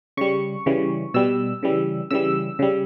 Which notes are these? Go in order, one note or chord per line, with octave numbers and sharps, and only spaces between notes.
C#3 G3 C#6
C#3 E3 G3
B2 G3 E6
C#3 E3 G3
C#3 E3 G3 E6
C#3 G3